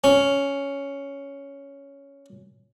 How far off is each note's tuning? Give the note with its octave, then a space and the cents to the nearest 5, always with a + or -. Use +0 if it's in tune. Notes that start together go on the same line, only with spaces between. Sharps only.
C#4 +5